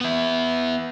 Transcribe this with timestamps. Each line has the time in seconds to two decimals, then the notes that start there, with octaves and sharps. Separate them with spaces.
0.01 B3 E4